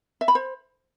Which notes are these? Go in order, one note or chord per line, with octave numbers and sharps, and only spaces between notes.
E5
B5
C5